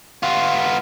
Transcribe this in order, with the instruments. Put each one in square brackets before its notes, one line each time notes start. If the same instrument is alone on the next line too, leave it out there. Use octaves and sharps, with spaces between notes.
[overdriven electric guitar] B3 F4